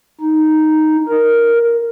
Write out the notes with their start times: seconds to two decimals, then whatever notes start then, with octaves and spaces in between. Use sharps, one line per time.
0.21 D#4
1.09 A#4